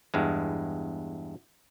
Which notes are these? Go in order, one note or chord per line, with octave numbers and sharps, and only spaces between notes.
E2 G2 G#3